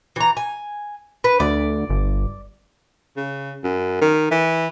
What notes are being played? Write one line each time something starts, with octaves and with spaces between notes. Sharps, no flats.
E3 A#5
G#5
B4
D2 D5
G1
C#3
F#2
D#3
E3